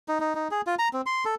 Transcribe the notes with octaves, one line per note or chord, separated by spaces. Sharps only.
D#4
D#4
D#4
G#4
F4
A#5
C4
C6
A4